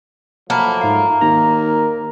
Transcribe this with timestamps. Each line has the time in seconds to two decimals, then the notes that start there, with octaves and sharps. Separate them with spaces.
0.50 F3 F#3 A3 A#3 F#5 A5 B5
0.81 G#2 F5
1.21 D#2 A#4 A#5